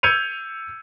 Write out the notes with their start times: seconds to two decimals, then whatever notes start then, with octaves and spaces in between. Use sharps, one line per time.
0.03 E6 G6 G#6 C#7 D#7 F7